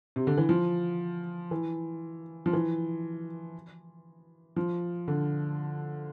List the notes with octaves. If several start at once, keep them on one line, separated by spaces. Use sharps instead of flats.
C3
D3
E3
F3
E3
F3
E3
F3
D3